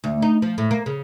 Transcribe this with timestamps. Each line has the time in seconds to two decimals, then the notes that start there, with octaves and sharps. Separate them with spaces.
0.04 D2
0.22 D#4
0.42 F3
0.58 A2
0.71 A#3
0.86 C#3